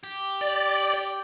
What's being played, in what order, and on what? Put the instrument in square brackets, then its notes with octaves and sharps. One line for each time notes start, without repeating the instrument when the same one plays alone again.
[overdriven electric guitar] G4
[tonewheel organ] D5